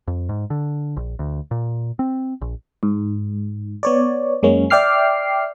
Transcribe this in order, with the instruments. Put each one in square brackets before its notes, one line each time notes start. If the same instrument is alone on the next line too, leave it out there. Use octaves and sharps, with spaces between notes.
[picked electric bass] F2
G#2
D3
A#1
D2
A#2
C4
A#1
[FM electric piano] G#2
B3 C#5 D5
F#2 G#3 A#3 C#4
D5 E5 G5 D6 F6 C7